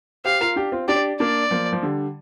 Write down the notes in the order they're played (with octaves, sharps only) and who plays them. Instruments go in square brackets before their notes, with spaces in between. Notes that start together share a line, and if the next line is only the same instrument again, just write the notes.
[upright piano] G4 C5 [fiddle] F5
[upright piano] F4 A#4
D4 G4
C4 F4
[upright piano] D4 G4 [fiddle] D5
[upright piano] A#3 D4 [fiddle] D5
[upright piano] F3 A#3
F3
D3 G3